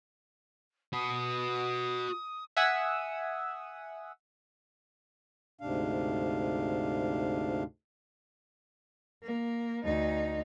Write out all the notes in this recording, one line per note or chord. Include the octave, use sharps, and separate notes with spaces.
F#4 B4 D#6
E5 F#5 G#5 D#6 E6
D2 G#2 C3 D4 F5
A#3
D2 D#4